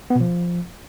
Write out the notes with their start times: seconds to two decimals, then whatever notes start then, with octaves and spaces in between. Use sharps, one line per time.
0.10 B3
0.15 B2
0.21 F3